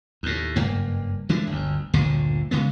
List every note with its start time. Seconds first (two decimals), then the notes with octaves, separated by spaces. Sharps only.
0.23 D#2 A2
0.56 F#1 G2 A#3
1.29 E3 G#3 A3 D4
1.47 G1 D2
1.94 G1 D2 A#2 D3
2.51 C#3 G#3 B3